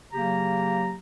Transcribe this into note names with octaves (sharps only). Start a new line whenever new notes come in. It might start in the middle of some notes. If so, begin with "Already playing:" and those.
C#3 F#3 A#3 G4 A#5